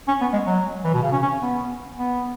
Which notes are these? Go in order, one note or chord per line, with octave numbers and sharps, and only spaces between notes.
C#4
B3
G#3
F#3
E3
B2
C#3
C#4
C#4
B3
B3